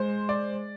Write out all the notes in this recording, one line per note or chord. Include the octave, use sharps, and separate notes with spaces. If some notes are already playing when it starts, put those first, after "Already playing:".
Already playing: G#3 C5
D5